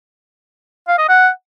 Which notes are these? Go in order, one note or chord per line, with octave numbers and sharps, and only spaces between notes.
F5
D#5
F#5